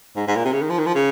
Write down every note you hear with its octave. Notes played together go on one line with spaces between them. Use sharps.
G#2
G#2
A#2
C3
C#3
D#3
F3
D#3
F3
C#3